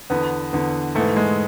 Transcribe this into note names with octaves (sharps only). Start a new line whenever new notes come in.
E2 D3 B3
E2 D3
G#2 E3 A3
G#3